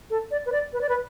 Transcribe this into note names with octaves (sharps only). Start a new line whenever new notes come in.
A4
D5
B4
D5
B4
D5
B4